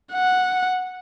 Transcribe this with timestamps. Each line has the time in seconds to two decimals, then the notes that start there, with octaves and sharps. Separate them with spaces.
0.13 F#5